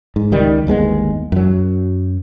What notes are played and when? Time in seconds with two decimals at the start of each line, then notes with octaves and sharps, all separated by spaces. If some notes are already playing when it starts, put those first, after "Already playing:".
0.16 G#2
0.32 C#2 D#3 G3
0.67 G1 D#2 G#3 B3
1.32 F#2 F#3